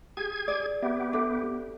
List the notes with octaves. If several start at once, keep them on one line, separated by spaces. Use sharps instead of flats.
G4 G#4 G#6
D5
B3 G4 E5
D4 A4 E5 D6